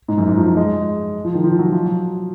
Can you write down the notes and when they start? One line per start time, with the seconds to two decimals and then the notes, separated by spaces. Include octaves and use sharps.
0.08 G#2
0.18 F#2
0.27 G#2
0.37 F3
0.57 G#3
1.25 F3
1.35 D#3
1.44 F3
1.59 F#3
1.72 F3
1.86 F#3